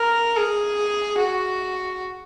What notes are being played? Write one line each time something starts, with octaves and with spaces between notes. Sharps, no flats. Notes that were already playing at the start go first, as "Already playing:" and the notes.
Already playing: A#4
G#4
F#4